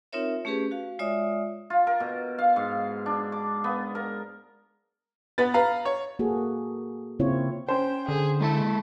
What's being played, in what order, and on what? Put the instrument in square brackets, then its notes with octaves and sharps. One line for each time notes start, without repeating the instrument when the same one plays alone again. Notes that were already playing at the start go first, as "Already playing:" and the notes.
[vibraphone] C4 D#4 F4 A#4 C#5 E5
A3 C#4 G4 G#4 B4
F#4 F5
G#3 F4 C#5 D5 E5 D#6
[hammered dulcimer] F4
A#4
B2
F5
G#2
D4
D6
B3
A#4
[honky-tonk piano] B3 B4 A6
B4 F5 A#5
C#5
[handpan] A#3 F#4 G#4 A4
C#3 A#3 C4 E4 F4 C#5
[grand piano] C#4 C5 [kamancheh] G5
[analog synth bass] D3 [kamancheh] G#4
[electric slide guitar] G#3 A4 A5 [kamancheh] E4